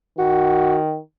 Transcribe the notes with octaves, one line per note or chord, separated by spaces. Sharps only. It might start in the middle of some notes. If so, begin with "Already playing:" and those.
D#3 F#4